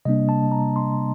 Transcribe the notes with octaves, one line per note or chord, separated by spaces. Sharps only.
C3 G3 A#3 D4 D#5
A5
A#5
C6